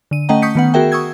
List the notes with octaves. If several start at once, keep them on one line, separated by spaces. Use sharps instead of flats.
D3 D#7
A3 C#4 D#5 F#5 G5 A#5
C#6 D#6 G6 B6 C#7
D#3 B3 F#5
F#4 G#4 A#4 E5 G5
C#6 D#6 E6 G#6